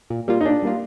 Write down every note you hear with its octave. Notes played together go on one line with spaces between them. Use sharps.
A#2
G3 A#3 F4
D#4
A#2 D4
G3 A#3 F4